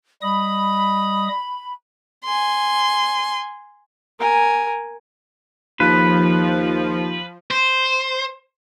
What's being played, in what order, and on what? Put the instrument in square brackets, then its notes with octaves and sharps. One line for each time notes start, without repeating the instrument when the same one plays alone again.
[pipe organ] G3 D#5 D#6 [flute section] B5
[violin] G#5 C6
[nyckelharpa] A#4 G#5
[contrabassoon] D#2 [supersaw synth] F3 [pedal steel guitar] B4
[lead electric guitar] C5